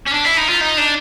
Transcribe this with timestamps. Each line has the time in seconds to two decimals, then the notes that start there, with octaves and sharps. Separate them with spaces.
0.06 C#4
0.12 D4
0.25 E4
0.37 D#4
0.49 F4
0.61 D#4
0.77 D4